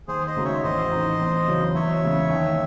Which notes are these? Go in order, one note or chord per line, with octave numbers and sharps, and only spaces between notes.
D#2 G#4 C5
C5 D#5
C#3 G#3 D#4 F#4
C#5 E5
A1 C5 D#5
A2 E3 C4 D#4
E2
C#3 F#3 C#4
E2 C#5 E5
C#3 G#3
D#2